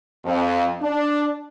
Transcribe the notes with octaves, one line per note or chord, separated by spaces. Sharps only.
F2
D4